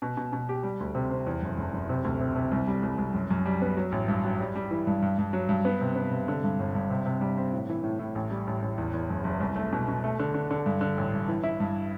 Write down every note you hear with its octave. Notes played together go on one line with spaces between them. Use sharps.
B2
B2
B2
G4
G3
D2
C3
C4
E2
F#1
F#1
F#1
C3
D2
C3
C3
C2
G3
C2
C2
F#2
F#2
G3
B3
F#3
A1
G2
F#3
G3
G3
E3
G2
G2
G2
F#3
G2
B3
C3
B3
C3
D3
G2
G1
G2
C3
C3
G3
C4
A2
E3
A2
A2
A1
G3
A1
A1
E2
E2
F#1
F#1
C2
A3
B2
B2
A3
D3
D3
D3
G2
D3
A1
G2
E3
E4
G2